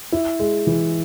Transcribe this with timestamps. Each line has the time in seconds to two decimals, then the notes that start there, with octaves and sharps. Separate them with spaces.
0.12 E4
0.40 G#3
0.67 E3